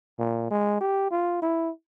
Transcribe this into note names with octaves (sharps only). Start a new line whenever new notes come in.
A#2
G#3
G4
F4
E4